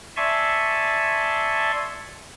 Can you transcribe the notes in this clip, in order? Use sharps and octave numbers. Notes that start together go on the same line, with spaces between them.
D5 E5 G#5 A5 C6 C#6